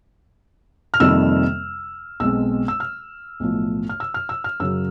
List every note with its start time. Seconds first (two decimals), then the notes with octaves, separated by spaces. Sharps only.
0.94 F6
1.00 F2 C3 D#3 G3 A#3 E6
2.20 B1 B2 G#3 C4 E6
2.68 E6
2.80 F6
3.40 B1 A2 F3
3.89 F6
4.00 E6
4.14 F6
4.29 E6
4.44 F6
4.60 F#2 C#3 F#3 E6